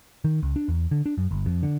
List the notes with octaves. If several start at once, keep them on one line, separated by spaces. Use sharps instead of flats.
D#3
C#2
D4
E2
D3
D4
F#2
G1
F2
D3